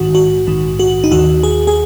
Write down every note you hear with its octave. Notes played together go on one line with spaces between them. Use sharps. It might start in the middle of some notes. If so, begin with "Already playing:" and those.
Already playing: A#1 G#2 D#3 F#4
F#4
A#1 G#2 D#3
F#4
D#4
D#2 D#3 F#4
G#4
G#4